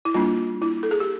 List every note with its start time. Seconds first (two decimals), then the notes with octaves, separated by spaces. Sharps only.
0.05 E4
0.14 G3 A#3 D4 F4
0.62 E4
0.83 A4
0.91 G#4
1.00 G4